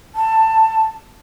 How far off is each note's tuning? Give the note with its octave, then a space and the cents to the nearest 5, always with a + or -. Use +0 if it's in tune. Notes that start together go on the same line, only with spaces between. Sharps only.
A5 +15